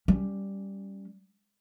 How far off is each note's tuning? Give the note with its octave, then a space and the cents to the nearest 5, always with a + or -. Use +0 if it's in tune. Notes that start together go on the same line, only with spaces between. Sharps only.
G3 +0 C#4 +10